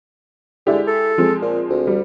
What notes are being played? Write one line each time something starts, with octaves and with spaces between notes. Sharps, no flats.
D3 G#3 E4 G4
A4
F3 G#3 C4
A#2
D2
G3